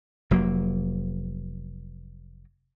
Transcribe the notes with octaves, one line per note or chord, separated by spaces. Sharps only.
F1 F#3 A#3